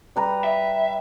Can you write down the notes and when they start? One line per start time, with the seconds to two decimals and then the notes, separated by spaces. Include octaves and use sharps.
0.16 G3 B4 A#5
0.44 E5